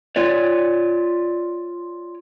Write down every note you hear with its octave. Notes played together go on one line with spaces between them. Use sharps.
F4 C#5 D5